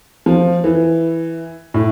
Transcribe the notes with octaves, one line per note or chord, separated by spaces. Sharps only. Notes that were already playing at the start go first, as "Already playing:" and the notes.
F3
E3
A2